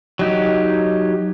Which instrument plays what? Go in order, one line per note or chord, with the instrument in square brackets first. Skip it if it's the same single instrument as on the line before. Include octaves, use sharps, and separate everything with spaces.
[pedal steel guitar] F#3 D#4 G4